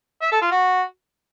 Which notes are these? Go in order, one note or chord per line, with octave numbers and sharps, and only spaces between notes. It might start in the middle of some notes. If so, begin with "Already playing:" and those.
E5
A4
F4
F#4